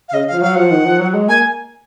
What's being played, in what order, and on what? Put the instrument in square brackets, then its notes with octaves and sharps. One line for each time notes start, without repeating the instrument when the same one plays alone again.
[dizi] F5
[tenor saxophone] C#3 [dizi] D#5
[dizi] F5
[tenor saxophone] F3
[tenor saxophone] F#3 [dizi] F5
[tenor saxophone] F3 [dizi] F#5
[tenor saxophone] D#3
F3
F#3
G#3
[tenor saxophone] A#3 [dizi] G#5